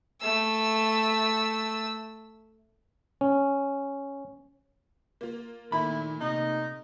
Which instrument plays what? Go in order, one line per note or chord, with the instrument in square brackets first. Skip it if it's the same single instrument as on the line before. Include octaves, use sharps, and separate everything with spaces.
[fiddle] A3 E6
[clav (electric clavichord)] C#4
[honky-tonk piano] A#3 F4
[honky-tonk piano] A#2 A3 [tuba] D#3 [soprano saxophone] E4 [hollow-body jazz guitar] B5
[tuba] C3 [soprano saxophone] D#4